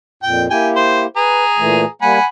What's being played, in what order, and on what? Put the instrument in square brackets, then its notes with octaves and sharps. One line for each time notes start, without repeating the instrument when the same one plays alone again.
[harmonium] F2 A#2 [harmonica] G5
[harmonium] A#3 E4 G4 [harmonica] G5 G#5
[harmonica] C5
[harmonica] G#4 A#5 [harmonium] B4
[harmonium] A#2 E3 A3
[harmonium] G3 A#3 [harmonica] F#5 G#5 B5